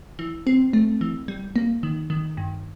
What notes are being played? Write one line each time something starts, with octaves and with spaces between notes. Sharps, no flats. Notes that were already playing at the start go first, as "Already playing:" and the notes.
E3
C4
A3
E3
G3
A#3
D#3
D#3
G2